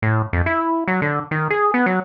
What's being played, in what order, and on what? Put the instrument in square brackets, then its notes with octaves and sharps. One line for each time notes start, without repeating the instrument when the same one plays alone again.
[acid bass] A2
F2
E4
F#3
D3
D#3
G#4
B3
F#3